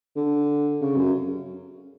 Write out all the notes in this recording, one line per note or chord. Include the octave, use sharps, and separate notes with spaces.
D3
C#3
F#2